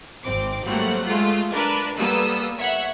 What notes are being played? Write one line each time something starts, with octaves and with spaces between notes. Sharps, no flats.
G#1 C4 D6
F#3 G3 A3 A#3 C4 F#5
G#3 A3 F4
D4 A#4 B4
G3 A#3 B3 A4 D#6 E6
C#5 E5 F#5